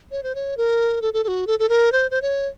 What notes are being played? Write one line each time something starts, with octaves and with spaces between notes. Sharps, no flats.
C#5
C5
C#5
A#4
A4
A4
A4
F#4
A4
A4
A#4
C5
C5
C#5